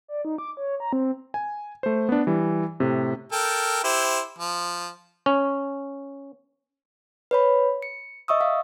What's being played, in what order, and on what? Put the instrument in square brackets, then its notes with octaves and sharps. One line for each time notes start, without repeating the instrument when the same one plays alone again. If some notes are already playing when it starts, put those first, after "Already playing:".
[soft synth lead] D5
D#4
D6
C#5
A#5
C4
[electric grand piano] G#5
A3 C5
B3 D4
E3 G3
A2 C3
[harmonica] A4 A#4 G5
E4 G4 C5
F3
[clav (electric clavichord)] C#4
[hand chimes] B4 C#5 B5
C#7
D#5 E5 C#6 D#6 E6
F5